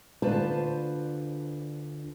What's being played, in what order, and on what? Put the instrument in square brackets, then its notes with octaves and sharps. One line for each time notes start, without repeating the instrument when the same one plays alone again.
[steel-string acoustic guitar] D2 D4 F4 B4 C5 A5